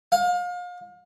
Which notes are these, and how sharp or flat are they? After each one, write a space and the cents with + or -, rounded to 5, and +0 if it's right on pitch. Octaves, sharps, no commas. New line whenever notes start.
F5 +35